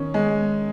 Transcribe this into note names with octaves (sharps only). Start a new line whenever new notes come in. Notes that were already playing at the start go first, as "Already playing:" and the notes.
Already playing: D#3 C#4
G#3